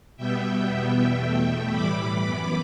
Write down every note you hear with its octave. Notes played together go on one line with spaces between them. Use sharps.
B2 G3 B3 E5 G5
E2 B2 G3 B3
E2 B2 A3
A2 E3 G3 B5 D6
F#2 E3 B3